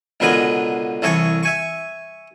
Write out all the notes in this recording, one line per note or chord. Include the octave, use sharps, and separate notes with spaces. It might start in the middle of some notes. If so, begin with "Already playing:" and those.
C#2 B2 D3 A#4 B4 G#5
C2 E3 A4 C#5 G#5 C#6
E5 G#5 C#6